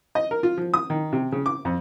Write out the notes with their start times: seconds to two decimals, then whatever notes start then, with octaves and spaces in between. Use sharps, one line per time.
0.15 D#5
0.31 A#4
0.43 F4
0.58 F3
0.74 D#6
0.90 D#3
1.13 C3
1.32 C#3
1.46 D6
1.65 F2